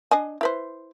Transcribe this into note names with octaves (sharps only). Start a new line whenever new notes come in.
D4 D#5 G#5
E4 B4 C5